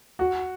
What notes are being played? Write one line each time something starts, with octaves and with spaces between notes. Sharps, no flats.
F#4